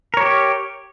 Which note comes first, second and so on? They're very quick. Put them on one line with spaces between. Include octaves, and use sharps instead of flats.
A#4 C#5 G4